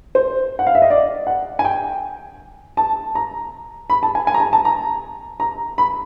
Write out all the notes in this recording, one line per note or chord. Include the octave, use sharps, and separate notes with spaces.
C5
F#5
F5
E5
D#5
D5
F#5
G#5
G5
A5
A#5
B5
A5
G#5
G#5
A#5
A5
A5
A#5
A#5
B5